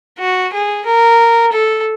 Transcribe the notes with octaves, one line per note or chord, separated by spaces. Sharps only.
F#4
G#4
A#4
A4